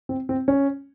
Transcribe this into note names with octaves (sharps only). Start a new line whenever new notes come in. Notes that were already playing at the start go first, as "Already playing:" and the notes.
C4
C4
C#4